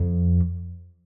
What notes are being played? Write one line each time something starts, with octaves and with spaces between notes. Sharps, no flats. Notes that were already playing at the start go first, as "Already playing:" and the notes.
Already playing: F2